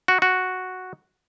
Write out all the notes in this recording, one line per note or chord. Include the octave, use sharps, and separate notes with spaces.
F#4
F#4